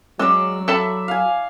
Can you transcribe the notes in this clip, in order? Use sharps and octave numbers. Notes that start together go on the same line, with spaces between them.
F#3 G#3 C#4 D5 C#6 E6
A4 E5 A5 B5
F5 G#5